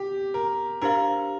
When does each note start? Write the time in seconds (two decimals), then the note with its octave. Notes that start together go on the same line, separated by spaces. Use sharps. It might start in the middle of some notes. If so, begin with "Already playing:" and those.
Already playing: G4
0.34 A#4
0.81 D4 G4 A#4 C5 F5